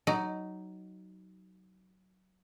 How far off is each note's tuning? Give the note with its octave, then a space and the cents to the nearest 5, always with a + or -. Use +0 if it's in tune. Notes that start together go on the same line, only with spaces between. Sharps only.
F#3 +15 D#4 +0